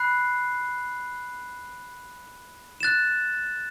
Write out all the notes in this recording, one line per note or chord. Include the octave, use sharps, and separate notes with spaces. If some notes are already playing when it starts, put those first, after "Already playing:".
Already playing: B5 F#6 C7
F#6 A6 E7